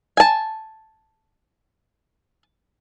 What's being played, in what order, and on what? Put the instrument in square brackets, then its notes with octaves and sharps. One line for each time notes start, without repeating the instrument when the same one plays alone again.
[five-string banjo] G#5 A5